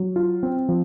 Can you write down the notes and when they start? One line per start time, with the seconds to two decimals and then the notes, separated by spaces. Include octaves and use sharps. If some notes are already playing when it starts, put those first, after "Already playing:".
Already playing: F#3
0.16 F4
0.43 C4
0.69 F3